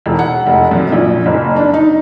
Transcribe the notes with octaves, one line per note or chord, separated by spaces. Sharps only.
E1
F#5
F1
F#2
A#1
F#1
D4
D#4